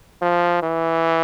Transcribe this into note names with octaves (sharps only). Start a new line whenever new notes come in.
F3
E3